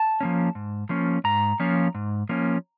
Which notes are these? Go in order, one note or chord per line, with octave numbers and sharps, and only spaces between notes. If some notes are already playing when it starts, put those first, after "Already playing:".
Already playing: A5
F3 A#3 C#4
G#2
F3 A#3 C#4
G#2 A#5
F3 A#3 C#4
G#2
F3 A#3 C#4